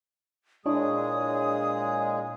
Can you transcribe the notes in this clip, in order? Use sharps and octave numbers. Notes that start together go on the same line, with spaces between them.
A#2 G#3 D4 E4 G#4 C#5 D#6